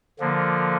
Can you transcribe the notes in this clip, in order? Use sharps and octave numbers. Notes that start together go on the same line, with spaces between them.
D3 F3 A#3